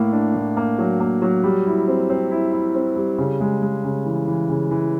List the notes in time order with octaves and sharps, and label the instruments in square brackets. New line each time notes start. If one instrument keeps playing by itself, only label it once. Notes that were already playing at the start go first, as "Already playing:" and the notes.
Already playing: [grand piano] A2 A#3
D4
A2
A#3
F#3
A#3
F#3
G3
E4
C4
C4
E4
E4
C4
G3
C#3
G#3
G#3
C#3
E3
E3
C#3
E3